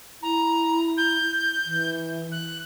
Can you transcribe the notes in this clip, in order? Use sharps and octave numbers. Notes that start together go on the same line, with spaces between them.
E4 A#5
G6
E3
F#6